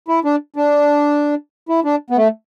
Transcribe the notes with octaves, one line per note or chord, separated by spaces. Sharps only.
E4
D4
D4
E4
D4
B3
A3